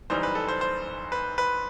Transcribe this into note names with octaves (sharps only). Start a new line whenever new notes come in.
F#1 F#2 E3 G3 D#4 C5
B4
A4
C5
C5
B4
B4